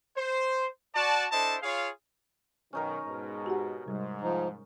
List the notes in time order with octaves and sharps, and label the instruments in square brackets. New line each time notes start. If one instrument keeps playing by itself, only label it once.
[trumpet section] C5
F#4 D5 A5
D4 E4 A4 C5 D#5 A5
F4 G#4 C#5 F5
[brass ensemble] B1 D#3 [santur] C#4 D#4 A#4
[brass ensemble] G#2 B2 G#3
[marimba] F#4 G4 F#5
[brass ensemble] G#2 [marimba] C3 G3
[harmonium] F3 D#4